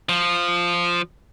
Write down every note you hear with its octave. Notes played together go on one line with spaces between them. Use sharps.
F3